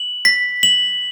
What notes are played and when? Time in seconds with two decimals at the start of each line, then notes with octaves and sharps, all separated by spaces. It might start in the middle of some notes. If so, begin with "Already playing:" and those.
Already playing: F#7
0.25 B6
0.63 F#7